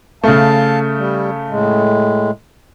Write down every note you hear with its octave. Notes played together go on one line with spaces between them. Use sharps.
C#3 A3 F5 A5
G3
A2 G#3